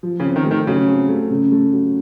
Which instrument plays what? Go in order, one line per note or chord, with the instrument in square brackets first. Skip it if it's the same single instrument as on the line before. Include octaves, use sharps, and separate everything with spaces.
[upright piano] F3
[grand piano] C#3
[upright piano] C4
[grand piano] D#3
[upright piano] A3
[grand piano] D#3
[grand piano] C#3 [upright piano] F#3
[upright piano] C4
A3
C#3
A3
F#3